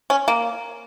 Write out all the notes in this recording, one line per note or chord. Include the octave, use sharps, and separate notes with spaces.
C#4
A#3